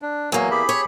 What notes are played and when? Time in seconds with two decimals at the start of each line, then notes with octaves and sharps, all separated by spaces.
0.02 D4
0.32 E2 F#3 A#3 G#5
0.51 G4 G#4 B5
0.69 C#5